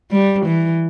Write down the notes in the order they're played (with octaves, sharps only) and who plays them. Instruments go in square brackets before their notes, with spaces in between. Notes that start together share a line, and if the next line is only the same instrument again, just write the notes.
[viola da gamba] G3
E3